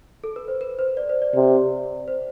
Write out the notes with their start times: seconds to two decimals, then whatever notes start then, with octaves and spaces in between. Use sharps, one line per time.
0.24 A4
0.36 B4
0.48 C5
0.61 B4
0.79 C5
0.97 D5
1.09 C5
1.22 D5
1.35 C3
2.08 C5